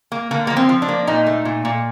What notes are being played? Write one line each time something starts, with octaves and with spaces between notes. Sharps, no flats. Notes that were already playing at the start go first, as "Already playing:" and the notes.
A#3
D3 A#3
F3 A#3
C4
F3
D4
A#3
A#2 D#4
A3
A#2
A#2